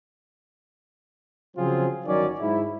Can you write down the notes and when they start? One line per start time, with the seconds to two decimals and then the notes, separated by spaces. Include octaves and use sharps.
1.57 C#3 F3 F#3 C4 F4 G#4
2.07 G1 D#3 F#3 C#4 D5
2.39 G#2 E4